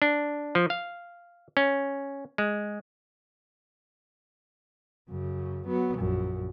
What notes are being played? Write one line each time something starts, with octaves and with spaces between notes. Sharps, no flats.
D4
F3
F5
C#4
G#3
F#2 C#3
F#3 B3
A#1 F#2